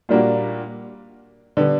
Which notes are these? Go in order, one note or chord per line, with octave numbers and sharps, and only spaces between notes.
A#2 G3 A#3 D4 F#4
D3 G3 B3